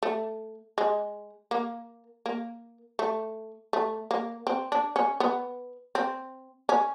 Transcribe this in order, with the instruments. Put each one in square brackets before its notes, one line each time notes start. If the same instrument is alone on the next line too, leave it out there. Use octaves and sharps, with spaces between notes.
[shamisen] A3
G#3
A#3
A#3
A3
A3
A#3
C4
D4
C#4
B3
C4
C#4